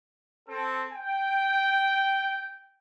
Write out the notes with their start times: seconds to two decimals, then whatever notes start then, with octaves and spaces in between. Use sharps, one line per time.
0.48 C4 A4
0.93 G5